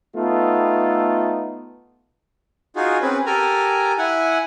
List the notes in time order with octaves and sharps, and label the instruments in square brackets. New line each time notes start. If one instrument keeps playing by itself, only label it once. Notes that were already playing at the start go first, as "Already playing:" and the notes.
[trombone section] A3 B3 D#4 F4 A4
[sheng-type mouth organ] D#4 F4 F#4 G#4
C4 C#4 G#4 B4
G4 A4 A#4 G#5 A#5
E4 F#5 G#5